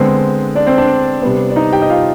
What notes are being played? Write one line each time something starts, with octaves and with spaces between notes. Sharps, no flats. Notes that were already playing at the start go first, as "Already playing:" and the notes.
Already playing: D3 G#3 B3 C4 C5
D4 D5
C4 C5
D4 D5
C3 G3 B3
D5
D#4 D#5
G4 G5
D#5
F4 F5